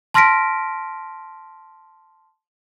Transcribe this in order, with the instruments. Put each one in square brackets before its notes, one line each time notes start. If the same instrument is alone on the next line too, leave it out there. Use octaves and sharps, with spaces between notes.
[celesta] A5 C6 F6 A#6 B6 D7